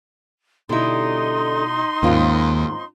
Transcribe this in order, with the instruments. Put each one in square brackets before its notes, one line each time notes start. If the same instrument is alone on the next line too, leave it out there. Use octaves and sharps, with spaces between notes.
[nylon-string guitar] B2 E4 [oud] D3 G3 [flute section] D#4 C6
[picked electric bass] D#2 [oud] G#2 A#3 [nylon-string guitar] C4 C#4 F4